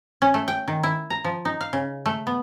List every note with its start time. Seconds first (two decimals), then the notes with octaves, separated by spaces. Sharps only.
0.22 C#4
0.34 A3
0.48 G5
0.68 D#3
0.83 E4
1.10 A#5
1.25 F3
1.45 D#4
1.61 F5
1.73 C#3
2.06 A3
2.27 B3